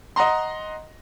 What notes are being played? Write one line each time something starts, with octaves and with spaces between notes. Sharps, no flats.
D#5 F#5 A#5 C6